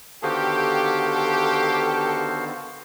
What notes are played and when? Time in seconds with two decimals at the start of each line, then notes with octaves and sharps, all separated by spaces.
0.23 D3 D#3 B3 F#4 G4 A4 C5 F5